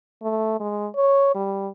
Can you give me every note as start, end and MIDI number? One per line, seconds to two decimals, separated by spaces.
0.22 0.58 57
0.60 0.87 56
0.96 1.30 73
1.35 1.69 55